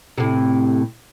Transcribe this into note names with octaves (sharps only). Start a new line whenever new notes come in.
A2 C3